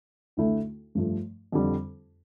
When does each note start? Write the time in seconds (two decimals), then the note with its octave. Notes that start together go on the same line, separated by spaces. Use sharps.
0.37 D2 D3 A3 E4 A4
0.95 G2 F3 A3
1.52 F2 D3 G3